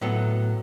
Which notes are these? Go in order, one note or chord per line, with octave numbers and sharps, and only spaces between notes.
A2 F#3 B3 A4